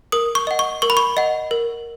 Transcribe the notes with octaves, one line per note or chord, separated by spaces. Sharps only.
A#4 D#6
C#6
D#5 F#5
C#6
A#4 C#6
B5
C#6
D#5 F#5
A#4